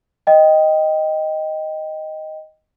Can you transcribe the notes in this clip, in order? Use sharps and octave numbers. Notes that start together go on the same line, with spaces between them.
D#5 G5